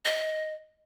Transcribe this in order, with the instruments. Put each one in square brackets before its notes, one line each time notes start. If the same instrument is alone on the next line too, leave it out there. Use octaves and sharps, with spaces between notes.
[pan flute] D#5